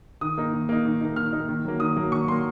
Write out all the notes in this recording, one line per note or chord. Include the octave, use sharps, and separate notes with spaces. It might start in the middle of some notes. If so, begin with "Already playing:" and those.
D#3 D#6
A#3 D#4
D#3
A#3 D#4
D#3
A#3 D#4
D#3 F6
A#3 D#4
D#3
F#3 A#3
D#3 D#6
F#3 A#3
D#3 C#6
F#3 A#3 C6